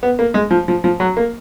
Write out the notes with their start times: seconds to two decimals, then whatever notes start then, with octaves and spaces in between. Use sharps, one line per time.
0.03 B3
0.19 A#3
0.34 G#3
0.51 F3
0.68 F3
0.84 F3
1.00 F#3
1.17 A#3